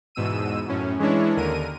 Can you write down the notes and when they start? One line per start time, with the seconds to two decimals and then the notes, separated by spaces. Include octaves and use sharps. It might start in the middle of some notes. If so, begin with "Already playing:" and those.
0.15 E2 G#2 B2 E6 D#7
0.68 F#2 A2 C#4
0.99 E3 G#3 C#4 D4 E4 C#5
1.37 D#2 D3 A#4 D#7